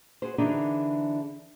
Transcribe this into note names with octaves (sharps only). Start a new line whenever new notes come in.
F#4 G#4 C5
D3 E3 D4 D#4 G#4 A#4